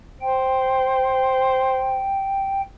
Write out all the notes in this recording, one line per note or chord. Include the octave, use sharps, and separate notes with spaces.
C5 G5